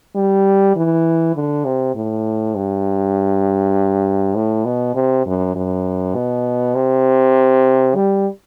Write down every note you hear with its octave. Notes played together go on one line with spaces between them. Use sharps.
G3
E3
D3
C3
A2
G2
A2
B2
C3
F#2
F#2
B2
C3
G3